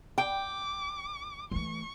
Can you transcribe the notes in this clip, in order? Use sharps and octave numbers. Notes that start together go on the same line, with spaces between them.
G5 D6
E3 A3 C#6